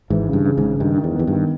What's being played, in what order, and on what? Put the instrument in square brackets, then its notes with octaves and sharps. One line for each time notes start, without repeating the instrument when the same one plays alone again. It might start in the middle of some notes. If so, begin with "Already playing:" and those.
[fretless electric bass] G#1 G#2 [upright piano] E3
[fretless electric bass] G2 [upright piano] C#3
[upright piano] C#3
[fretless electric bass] G#1 G#2
[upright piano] C#3
[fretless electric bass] G2 [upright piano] D#3
[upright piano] D#3
[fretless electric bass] E2
[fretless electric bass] E2 [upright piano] B3
[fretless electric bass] G2 [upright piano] D#3